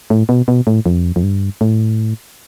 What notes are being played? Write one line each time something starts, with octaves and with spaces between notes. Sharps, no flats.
A2
B2
B2
A2
F2
F2
G2
A2